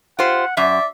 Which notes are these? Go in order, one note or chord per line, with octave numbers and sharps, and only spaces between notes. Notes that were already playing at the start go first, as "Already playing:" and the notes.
F4 G4 C5 F#5
F#2 D5 E5